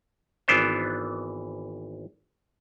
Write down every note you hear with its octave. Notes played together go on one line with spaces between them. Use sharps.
G#1 E3 B3 D4 C5